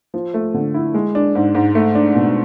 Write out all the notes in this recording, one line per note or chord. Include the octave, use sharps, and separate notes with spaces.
F3
A3
D3
E4
G#3
D4
G#2
G#2
A3
D4
B2